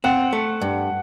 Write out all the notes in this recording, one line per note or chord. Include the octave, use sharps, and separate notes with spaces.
C4 F#5
A3
G2